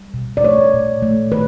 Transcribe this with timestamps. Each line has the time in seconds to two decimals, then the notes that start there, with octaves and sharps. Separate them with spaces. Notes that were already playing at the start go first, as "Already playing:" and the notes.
Already playing: G3
0.14 B2
0.37 D5
0.43 A3 C#5
0.74 A#2
1.02 A3
1.31 D#3 B4